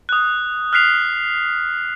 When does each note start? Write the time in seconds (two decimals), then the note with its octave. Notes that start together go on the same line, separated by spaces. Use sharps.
0.09 D#6 F#6
0.73 F6 F#6 B6 C7 F7